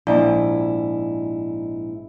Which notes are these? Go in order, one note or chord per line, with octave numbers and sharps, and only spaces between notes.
A#1 G#2 E4 D5